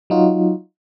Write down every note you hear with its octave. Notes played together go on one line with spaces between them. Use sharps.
F#3 D#4 F4 F#4